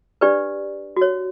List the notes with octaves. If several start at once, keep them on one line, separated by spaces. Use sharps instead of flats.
D4 G4 B4 D5
F#4 C#5